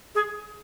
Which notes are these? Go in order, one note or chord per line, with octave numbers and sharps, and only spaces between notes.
G#4